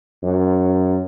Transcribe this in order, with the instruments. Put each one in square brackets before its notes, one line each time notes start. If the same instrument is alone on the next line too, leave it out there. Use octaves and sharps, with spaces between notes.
[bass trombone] F#2